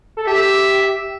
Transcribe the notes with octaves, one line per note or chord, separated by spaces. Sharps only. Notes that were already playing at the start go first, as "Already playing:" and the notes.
A4
G4 E5